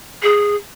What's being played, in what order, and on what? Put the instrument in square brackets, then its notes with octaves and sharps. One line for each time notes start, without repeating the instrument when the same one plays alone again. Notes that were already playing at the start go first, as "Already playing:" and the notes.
[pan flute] G#4